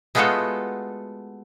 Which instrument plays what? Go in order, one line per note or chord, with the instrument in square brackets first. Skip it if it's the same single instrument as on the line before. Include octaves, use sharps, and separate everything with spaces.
[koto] G#3 A3 B3 F4 F#4 A4